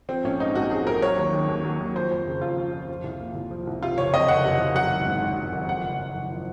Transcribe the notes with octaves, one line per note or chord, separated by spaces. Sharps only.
F3 C4
A#1 C#4
G#2 D#4
A#1 F#4
F3 G#4
A#1 A#4
F#3 C#5
D#2
D#3
D#2
F#3
D#2
F3 C5
F2
C#3
F2 F4
F3
F2
F3
C2
A#2
C2
F3
C2
C3 F4
F#1 C#5
F2 D#5
F#1 F#5
C3
F#1
F#3 F#5
G#1
G#2
G#1
F#3
G#1
F3 F#5
F#1
F#2
F#1
F3